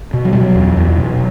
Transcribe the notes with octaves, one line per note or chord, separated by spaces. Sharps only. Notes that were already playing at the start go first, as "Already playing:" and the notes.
B2
F#3
B2 G3
F#3
E2
E2
B2